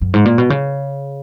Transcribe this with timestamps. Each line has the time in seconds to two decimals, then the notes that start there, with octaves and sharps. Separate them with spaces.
0.01 F#2
0.14 G#2
0.25 A#2
0.38 B2
0.50 C#3